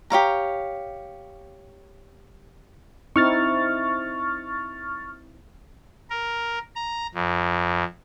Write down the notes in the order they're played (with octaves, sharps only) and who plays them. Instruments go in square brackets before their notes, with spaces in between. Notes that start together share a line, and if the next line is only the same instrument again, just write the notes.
[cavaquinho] G4 C#5 F5 A#5
[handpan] C4 D#4 E4 [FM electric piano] C#6 F6 A6
[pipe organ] A#4
A#5
F2